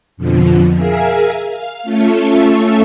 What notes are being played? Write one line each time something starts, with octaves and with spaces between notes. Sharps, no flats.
F2 B2 D3 F3
G#4 A#4 E5 F5 G#5
F5
A3 C#4 F4 A4 E5 C#6